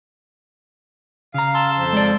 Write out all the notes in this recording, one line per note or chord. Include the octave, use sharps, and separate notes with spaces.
C#3 F5 A#5
A5 C6 E6
F2 F3
G#3 D5